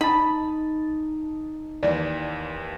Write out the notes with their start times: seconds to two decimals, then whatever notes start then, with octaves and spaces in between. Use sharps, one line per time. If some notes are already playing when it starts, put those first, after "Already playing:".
0.01 D#4 A5 B5
1.83 D#2 E3 D5